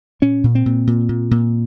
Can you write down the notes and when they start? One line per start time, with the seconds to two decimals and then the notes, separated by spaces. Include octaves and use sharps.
0.22 A#2 C#4
0.44 A#2
0.55 C4
0.66 A#2
0.87 A#2
1.09 A#2
1.31 A#2